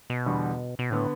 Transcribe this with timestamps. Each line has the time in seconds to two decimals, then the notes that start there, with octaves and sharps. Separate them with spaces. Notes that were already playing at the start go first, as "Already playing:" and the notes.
0.10 B2
0.26 E2 D3 G3
0.79 B2
0.90 A2 D3 B3